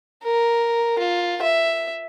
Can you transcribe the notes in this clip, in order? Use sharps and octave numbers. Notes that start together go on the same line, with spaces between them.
A#4
F4
E5